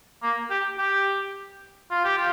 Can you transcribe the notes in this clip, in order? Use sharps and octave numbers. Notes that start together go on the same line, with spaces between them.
A#3
G4
G4
F4
G4
F4